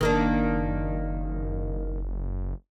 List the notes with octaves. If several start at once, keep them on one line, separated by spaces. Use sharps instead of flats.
F#1 D#3 A#3 D4